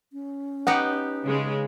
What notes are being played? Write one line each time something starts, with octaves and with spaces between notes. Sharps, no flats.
C#4
B3 D#4 G4 F#5
C#3 G#3